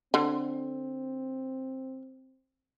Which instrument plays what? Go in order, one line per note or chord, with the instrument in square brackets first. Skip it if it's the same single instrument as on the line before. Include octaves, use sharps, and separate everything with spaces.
[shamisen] D3 [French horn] C4